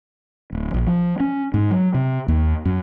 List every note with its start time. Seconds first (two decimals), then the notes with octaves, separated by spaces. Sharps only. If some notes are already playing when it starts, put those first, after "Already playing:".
0.52 D1
0.74 A#1
0.87 F3
1.20 C#4
1.54 G#2
1.71 F#3
1.94 C3
2.28 D#2
2.65 F#2